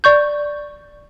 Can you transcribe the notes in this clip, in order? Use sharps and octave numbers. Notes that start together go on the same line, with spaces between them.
D5 C#6 G6